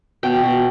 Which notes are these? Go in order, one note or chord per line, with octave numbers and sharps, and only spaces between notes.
B2 G5
B2